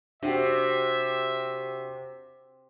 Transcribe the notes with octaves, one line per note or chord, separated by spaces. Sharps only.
C3 D4 F#4 G4 E5